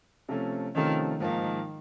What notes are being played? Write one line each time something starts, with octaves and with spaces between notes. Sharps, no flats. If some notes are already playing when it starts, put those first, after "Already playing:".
C3 F3 A3 C#4
C3 D#3 F3 A3 C#4
G#2 D#3 F3 A#3